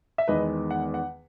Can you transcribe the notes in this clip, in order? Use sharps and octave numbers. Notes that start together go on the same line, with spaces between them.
E5
E2 D#3 G#3 B3 B4 D#5
F#5
F#5